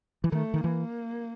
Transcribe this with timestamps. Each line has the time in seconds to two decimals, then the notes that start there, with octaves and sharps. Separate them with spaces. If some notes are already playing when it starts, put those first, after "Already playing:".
0.24 E3
0.32 D#3 A3
0.54 D#3
0.64 E3 A#3